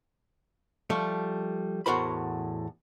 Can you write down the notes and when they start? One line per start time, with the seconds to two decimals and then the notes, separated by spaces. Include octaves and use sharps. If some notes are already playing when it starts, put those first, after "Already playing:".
0.90 F3 G3 A3
1.86 E2 A2 F#4 A#4 C5 B5